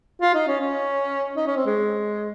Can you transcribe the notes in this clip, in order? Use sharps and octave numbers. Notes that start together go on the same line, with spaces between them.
F4
D#4
C#4
C#4
D#4
C#4
C4
G#3